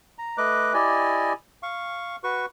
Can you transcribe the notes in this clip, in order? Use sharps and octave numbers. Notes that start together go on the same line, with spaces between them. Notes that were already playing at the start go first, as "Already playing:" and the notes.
A#5
A3 B4 D#5 D6 F#6
E4 G4 D5 D#5 G#5
F5 C#6
F#4 B4 C#6